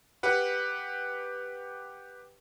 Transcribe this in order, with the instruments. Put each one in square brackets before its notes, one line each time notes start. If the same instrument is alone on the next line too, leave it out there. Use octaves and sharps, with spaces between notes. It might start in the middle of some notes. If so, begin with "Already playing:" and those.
[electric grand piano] G4 B4 F#5